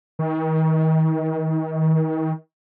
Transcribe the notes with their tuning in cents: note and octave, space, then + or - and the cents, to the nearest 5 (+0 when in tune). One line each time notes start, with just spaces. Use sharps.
D#3 +35